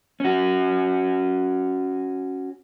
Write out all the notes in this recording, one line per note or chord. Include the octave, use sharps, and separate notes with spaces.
C#4 F#4